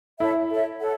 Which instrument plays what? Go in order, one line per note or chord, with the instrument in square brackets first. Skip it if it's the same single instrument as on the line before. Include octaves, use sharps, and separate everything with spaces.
[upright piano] E4 [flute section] A4 C#5 E5
[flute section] A4 C#5 E5
A4 C#5 F#5